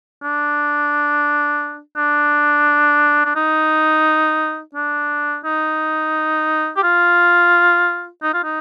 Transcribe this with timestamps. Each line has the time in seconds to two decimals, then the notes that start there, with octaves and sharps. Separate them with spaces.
0.23 D4
1.97 D4
3.25 D4
3.36 D#4
4.75 D4
5.45 D#4
6.76 G4
6.83 F4
8.23 D#4
8.34 F4
8.44 D#4